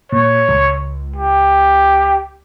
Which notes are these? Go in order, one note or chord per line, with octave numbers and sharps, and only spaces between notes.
A#2 C#5
C#2
G4